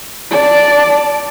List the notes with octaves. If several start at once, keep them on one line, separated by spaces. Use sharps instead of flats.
D5 A5